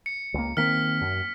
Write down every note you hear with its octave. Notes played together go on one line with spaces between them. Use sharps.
C#7
C#2 A#3
D#3 A#3 C4 F6 B6
F#2